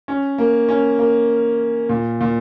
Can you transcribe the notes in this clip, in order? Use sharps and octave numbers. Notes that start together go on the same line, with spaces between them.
C#4
A#3
C#4
A#3
A#2
A#2